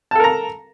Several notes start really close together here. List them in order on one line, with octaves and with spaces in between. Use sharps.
A5 A4 A#4 A#5